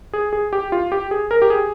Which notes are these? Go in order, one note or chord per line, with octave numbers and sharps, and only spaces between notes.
G#4
G#4
G4
F4
G4
G#4
A#4
G4
G#4